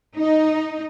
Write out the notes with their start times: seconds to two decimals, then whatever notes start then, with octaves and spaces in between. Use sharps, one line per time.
0.17 D#4